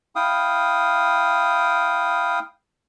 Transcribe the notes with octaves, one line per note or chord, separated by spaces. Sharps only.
E4 F5 G5 D#6